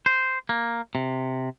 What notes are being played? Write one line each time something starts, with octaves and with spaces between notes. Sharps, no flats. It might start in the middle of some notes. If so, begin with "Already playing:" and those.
C5
A#3
C3